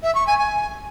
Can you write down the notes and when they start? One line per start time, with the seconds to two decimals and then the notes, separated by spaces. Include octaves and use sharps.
0.03 E5
0.14 C#6
0.26 G#5
0.38 G#5